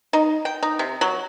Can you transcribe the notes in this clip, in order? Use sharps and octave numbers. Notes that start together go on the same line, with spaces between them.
D#4
G5
D#4
C3
F#3